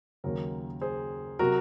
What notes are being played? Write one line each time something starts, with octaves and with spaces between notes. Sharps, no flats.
D#2 C#3 F#3 A#4 C#5
G#4 C5
C3 F#3 F#4 A#4